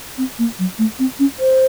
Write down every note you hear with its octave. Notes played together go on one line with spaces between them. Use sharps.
C4
A#3
F#3
A3
C4
C#4
C5